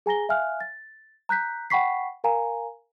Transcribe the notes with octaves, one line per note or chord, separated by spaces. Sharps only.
G#4 G#5 A#5 A#6 G7
E5 F5 G#5 F6 F#6
A6
A#5 F#6 G6 B6
F#5 G5 B5 C#6 B6 C7
A#4 F5 G#5 A#5